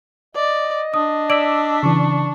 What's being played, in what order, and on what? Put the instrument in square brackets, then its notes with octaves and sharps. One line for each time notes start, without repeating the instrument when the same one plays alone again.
[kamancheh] D5 [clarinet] D#5
[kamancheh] D4 [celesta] D#6
[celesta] D5 D7 F#7 [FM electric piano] D6 E6 B6
[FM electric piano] C#3 E3 [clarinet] C#6